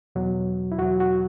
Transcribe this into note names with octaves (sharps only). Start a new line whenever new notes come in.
E2 B2 F#3
E4
E2 B2 F#3 F#4
F#4